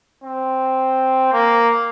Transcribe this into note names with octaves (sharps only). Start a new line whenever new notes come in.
C4
A#3